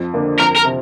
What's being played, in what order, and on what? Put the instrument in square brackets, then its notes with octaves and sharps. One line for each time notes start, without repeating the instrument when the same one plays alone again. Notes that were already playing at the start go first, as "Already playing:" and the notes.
Already playing: [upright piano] F2
D3 A#3 D4
[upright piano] F2 [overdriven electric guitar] A#4
[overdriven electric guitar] A#4
[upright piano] C3